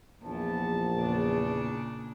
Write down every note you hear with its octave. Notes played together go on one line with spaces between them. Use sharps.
A#1 E2 A5
E2 A#2 C#3 D4